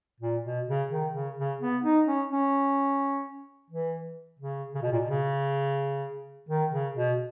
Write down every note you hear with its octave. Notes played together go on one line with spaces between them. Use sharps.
A#2
B2
C#3
D#3
C#3
C#3
B3
D#4
C#4
C#4
E3
C#3
C#3
B2
A#2
B2
C#3
D#3
C#3
B2